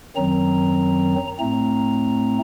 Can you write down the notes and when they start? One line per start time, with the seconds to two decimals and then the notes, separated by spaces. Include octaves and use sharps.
0.16 F#2 D#3 F#3 C4 A#5
1.39 A2 A3 C4 A#5